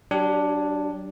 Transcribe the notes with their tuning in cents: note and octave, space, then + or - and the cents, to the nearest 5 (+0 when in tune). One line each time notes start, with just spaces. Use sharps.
F#3 +35 D4 +0 G4 +0